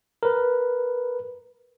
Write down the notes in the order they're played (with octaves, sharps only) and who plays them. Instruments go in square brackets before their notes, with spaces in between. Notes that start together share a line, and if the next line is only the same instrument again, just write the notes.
[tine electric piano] A#4 B4